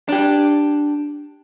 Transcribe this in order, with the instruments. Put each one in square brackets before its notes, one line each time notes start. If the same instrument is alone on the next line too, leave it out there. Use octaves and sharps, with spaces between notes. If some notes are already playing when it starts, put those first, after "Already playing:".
[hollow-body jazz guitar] D4 G4